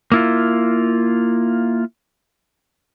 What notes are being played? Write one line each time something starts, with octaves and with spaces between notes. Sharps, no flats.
A#3 E4 F4